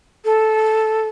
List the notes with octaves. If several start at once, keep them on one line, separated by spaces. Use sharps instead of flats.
A4